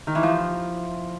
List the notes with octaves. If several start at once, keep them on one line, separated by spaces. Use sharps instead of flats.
D#3
E3
F3